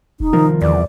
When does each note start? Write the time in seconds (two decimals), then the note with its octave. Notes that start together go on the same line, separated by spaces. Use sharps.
0.20 E1 D#4
0.33 C2 D#3 F3 A#4
0.62 E2 D5